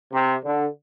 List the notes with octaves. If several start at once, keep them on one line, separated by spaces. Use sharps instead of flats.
C3
D3